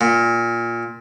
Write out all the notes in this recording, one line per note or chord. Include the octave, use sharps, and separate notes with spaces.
A#2